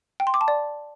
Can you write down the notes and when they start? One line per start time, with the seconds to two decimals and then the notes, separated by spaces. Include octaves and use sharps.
0.20 G5
0.27 C6
0.34 D6
0.41 A5
0.48 D5